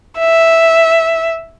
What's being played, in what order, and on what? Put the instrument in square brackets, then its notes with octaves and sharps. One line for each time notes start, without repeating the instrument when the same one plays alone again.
[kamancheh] E5